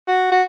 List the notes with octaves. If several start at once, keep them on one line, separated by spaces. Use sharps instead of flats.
F#4
F#4